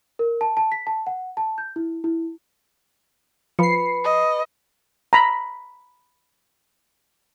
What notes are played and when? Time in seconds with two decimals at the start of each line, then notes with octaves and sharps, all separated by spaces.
0.19 A#4
0.41 A5
0.57 A5
0.72 B6
0.87 A5
1.07 F#5
1.37 A5
1.58 G6
1.76 E4
2.04 E4
3.59 F3 B4 B5 C7 C#7
4.05 D#5
5.13 A#5 B5